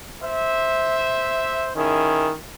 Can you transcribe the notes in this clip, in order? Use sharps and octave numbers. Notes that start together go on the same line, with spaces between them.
C5 E5
D#3 C#4 E4 G#4